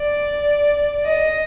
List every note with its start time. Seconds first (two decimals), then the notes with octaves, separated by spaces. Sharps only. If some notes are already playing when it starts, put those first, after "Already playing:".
Already playing: D5
1.05 D#5